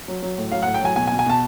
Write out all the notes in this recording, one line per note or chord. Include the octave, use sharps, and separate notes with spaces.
F#3
F#3
A2
F#3 F5
A2 F#5
G5
F#3 G#5
B2 G#5
G#5
B2
G#5
B2 A5